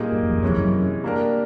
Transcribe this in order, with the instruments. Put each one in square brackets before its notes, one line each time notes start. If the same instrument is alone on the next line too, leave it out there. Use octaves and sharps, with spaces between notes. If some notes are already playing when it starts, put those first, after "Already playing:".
Already playing: [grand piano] A#2 G3 A#3 D#4 G#4
[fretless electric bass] G2
F#2
F2
[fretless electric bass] F2 [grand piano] C3 E3 G#3 C#4
[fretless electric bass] F#2
[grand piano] G3 A#3 D4 G4 A#4